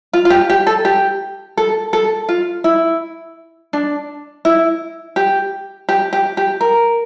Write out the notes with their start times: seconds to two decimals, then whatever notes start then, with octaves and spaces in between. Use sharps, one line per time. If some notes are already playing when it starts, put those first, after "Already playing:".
0.13 F4
0.25 F4
0.30 G4
0.50 G4
0.67 A4
0.85 G4
1.57 A4
1.93 A4
2.29 F4
2.64 E4
3.73 D4
4.45 E4
5.16 G4
5.89 G4
6.13 G4
6.37 G4
6.61 A#4